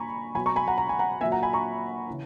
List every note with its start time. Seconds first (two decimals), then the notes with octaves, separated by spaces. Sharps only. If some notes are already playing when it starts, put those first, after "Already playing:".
Already playing: A#2 G#5 A#5 B5 C#6
0.35 B2 F#3 G#5 B5
0.46 A#5 C#6
0.56 G#5 B5
0.68 F#5 A#5
0.78 A#5
0.89 G#5
0.99 F#5 A#5
1.21 A#2 F#3 E5 G#5
1.32 F#5 A#5
1.43 G#5 B5
1.53 A#5 C#6
2.07 C#3 E3